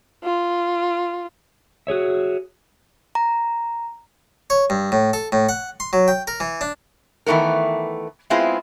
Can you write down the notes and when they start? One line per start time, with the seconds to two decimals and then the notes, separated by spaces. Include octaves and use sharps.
0.24 F4
1.87 F#4 G#4 C#5 E5
3.15 A#5
4.50 C#5
4.70 G2
4.92 A2
5.13 A4
5.32 A2
5.49 F#5
5.80 C6
5.93 F#3
6.08 G5
6.27 A#4
6.40 E3
6.61 D4
7.26 D#3 E3 A3 B3 A#4
8.30 G#3 B3 C4 E4 F4 G#4